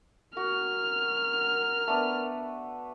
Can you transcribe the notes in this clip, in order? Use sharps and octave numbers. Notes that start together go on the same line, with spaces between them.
F#4 A#4 F6
A3 B3 D4